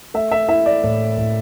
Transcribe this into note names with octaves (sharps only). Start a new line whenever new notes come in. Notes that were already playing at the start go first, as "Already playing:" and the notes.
A3 E5
E5
E4 E5
D5
A2
A2